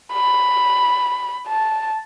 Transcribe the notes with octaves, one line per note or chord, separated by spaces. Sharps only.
B5
A5